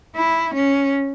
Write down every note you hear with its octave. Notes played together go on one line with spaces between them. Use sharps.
E4
C#4